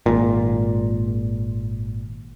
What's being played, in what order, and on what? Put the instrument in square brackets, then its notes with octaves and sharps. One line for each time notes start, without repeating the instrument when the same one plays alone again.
[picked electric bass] G#1 A#2